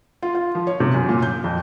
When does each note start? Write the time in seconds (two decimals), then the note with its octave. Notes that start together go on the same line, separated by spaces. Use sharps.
0.22 F4
0.35 F4
0.55 F3
0.67 C#5
0.80 C3
0.94 F#2
1.09 A#2
1.22 G6
1.44 F2